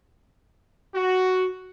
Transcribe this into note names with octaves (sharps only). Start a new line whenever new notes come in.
F#4